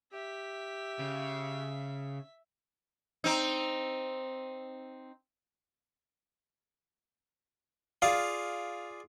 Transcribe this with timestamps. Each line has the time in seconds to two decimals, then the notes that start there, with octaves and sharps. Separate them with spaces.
0.12 G4 E5 B6
0.99 C#3
3.24 C4 D#4
8.02 F4 G#4 D5 F5